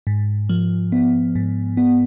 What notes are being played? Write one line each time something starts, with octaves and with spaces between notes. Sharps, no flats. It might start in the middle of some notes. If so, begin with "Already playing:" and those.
G#2
F3
B3
G#2
B3